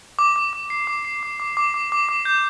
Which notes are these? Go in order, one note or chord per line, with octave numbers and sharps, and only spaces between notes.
D6
D6
D6
C7
D6
C7
D6
D6
D6
D6
D6
D6
G6